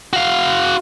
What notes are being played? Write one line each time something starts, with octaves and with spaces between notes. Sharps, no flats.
F#4 F5